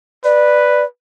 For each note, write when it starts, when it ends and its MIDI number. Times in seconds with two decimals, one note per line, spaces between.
0.24 0.86 71
0.24 0.85 74